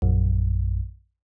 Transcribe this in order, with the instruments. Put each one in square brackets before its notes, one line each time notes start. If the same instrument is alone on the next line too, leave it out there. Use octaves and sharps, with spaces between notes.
[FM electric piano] A#1 F#2